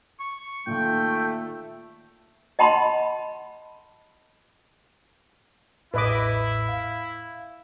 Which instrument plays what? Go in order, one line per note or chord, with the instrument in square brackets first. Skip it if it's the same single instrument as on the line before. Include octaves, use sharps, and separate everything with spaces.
[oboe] C#6
[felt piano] A#2 D#3 [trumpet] A3 [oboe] G5
[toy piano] D#5 F#5 A5 B5 C6
[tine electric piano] A1 E2 A2 [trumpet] E4 [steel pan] B4 D#5 D6
[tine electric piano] F5